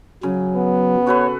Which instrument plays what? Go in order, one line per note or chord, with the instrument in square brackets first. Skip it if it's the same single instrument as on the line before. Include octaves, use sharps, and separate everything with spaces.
[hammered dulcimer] C#3 [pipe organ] F#3
[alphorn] B3
[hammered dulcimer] F#4 A4 B4 [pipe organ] C#5